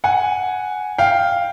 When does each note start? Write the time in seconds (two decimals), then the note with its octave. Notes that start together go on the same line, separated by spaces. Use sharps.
0.04 F#5 G#5
0.98 F5 G5